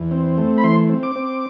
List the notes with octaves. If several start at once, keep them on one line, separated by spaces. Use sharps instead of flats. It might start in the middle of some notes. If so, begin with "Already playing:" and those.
Already playing: E2
C4
A3
B5
E3 C6
C4
D6
C4